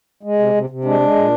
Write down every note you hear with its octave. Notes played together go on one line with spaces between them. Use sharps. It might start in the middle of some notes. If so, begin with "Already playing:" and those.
G#3
C3
C3
C3
G#3 D4
G#3
A#2